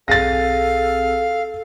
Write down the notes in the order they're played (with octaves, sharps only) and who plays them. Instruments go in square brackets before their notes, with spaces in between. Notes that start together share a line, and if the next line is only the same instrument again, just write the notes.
[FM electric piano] B1 C4 G#4 [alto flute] A4 [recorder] F5 [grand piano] A6 A#6